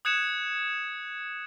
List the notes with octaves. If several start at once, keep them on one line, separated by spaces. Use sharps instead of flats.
D#6 F#6 G#6 C#7 E7